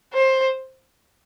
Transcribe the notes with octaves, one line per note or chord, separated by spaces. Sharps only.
C5